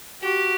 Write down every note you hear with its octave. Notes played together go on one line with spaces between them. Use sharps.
F#4 G4